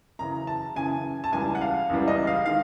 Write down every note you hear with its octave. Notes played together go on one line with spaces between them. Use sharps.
F#2 C#3 E3 A#5
A5
F#2 C#3 E3 G#5
A5
C#2 C#3 E3 G3 G#5
F#5
F5
C#2 C#3 E3 G3
D#5
F5
D#3 G#3 F5